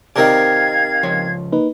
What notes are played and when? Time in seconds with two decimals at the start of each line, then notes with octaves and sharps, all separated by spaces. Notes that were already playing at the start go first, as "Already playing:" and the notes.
0.16 C3 D#3 C4 A#4 D5 D#5 F5 G#6
1.03 C#2 F3 C#5
1.52 A#3 D#4 B4